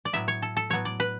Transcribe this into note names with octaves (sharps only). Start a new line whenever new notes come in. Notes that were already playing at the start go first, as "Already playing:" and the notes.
D5
A2 F#3 B3 E5
C#5
A4
A4
A2 F#3 B3 C#5
D5
B4